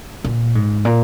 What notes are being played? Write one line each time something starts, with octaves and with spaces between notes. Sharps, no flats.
A#2
G#2
A#2